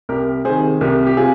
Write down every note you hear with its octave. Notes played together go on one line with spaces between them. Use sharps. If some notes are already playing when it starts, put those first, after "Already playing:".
C2 G4 A#4
C3 D#3 G#4 C5
C2 G4 A#4
G4
C3 F4 G#4